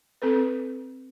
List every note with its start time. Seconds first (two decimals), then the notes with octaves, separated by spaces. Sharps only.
0.22 C4 A4 B4